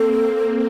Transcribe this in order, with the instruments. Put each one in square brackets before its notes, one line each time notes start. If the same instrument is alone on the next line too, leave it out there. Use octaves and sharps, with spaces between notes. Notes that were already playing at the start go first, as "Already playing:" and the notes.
Already playing: [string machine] A#3 C4 [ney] A4